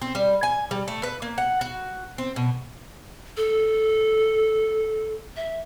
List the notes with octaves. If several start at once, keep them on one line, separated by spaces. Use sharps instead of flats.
C4
G3
G#5
G3
A3
B4
A#3
F#5
F#4
C4
B2
A4
E5